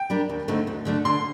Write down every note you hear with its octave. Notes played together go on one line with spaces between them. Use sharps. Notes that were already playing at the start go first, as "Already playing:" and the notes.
Already playing: G5
G3 D4 G4 A#4
D#2
D3 A3 C4 D#4
D2
D3 A3 D4
D3 C6